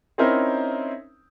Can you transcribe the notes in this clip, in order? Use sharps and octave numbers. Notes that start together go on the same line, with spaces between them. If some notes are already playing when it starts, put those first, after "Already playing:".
C4 C#4 D#4 E4 A#4 C5